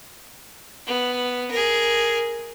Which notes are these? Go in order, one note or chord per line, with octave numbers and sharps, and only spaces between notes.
B3
G#4 A#4